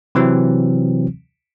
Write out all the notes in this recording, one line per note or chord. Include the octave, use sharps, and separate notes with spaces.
C3 E3 F#3 C4